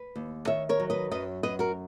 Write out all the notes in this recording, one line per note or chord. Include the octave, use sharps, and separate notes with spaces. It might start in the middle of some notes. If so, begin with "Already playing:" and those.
Already playing: B4
D#2
D#3 C#5 E5
A#4 C#5
F#3
B4 D#5
F#2 B4 D#5
F#2 B4 D#5
F#4 A#4